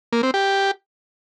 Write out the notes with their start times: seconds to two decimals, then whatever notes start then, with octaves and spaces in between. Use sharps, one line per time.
0.13 A#3
0.23 C4
0.34 G4